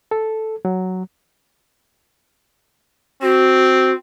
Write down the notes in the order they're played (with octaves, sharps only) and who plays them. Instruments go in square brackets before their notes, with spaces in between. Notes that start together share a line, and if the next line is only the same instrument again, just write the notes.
[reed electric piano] A4
F#3
[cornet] C4 [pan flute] F#4